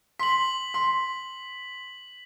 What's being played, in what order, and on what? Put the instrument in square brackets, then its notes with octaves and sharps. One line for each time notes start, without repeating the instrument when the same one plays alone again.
[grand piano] C6 [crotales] B6 F#7
[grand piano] C6